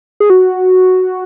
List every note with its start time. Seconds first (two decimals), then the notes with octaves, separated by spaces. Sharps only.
0.20 G#4
0.30 F#4